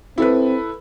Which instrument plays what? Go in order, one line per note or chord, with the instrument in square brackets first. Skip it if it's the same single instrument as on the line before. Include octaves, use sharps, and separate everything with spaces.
[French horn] C4 [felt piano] E4 A4 B4